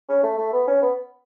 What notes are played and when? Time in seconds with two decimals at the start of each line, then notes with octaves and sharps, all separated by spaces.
0.09 C#4
0.23 A3
0.38 A3
0.52 B3
0.68 C#4
0.82 B3